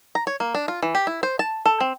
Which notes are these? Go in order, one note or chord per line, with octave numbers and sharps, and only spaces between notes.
A#5
C#5
A#3
D4
F4
E3
G4
E4
C5
A5
A4
C4